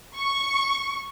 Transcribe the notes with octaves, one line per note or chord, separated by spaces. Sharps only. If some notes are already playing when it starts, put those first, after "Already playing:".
C#6